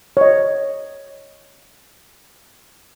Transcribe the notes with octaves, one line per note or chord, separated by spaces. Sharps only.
C#5 D#5